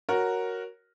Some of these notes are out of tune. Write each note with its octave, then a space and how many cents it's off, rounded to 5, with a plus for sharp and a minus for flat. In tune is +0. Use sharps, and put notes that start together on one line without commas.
F#4 +0 A#4 +0 C#5 +0